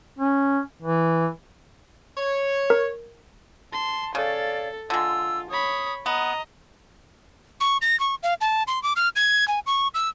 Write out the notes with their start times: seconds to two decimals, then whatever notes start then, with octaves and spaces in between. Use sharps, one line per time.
0.19 C#4
0.82 E3
2.18 C#5
2.70 A#4
3.73 A5 C6
4.15 C#3 A4 C#5 D5 F5
4.90 D3 G#3 F4 E6
5.50 C#5 B5 D#6
6.06 B3 D#5 A#5
7.61 C#6
7.82 A#6
8.00 C#6
8.23 F5
8.41 A5
8.67 C6
8.83 D6
8.96 F6
9.16 G#6
9.48 G#5
9.66 C#6
9.94 E6